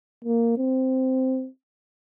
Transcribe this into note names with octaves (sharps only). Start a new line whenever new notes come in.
A#3
C4